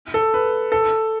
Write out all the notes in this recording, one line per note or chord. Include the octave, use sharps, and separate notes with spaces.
A4
B4
A4